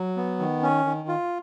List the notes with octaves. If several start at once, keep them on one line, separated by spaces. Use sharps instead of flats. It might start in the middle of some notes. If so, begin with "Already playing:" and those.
Already playing: F#3
B3
D#3
C#4
D#3
F4